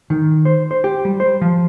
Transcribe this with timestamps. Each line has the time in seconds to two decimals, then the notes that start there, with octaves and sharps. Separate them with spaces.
0.10 D#3
0.45 C5
0.71 C5
0.84 G4
1.05 G3
1.20 C5
1.41 F3